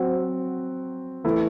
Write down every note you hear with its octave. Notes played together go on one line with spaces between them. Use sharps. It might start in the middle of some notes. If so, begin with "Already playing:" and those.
Already playing: F#3 C4 F#4
E3 A3 E4